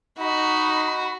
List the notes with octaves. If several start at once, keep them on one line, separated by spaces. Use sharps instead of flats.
D#4 F#4 B5